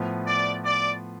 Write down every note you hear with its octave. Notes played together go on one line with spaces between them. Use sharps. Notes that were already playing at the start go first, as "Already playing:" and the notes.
Already playing: A2 F3 B3
D5
D5